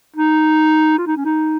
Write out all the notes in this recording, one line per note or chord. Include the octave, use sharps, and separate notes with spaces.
D#4
F4
D#4
C#4
D#4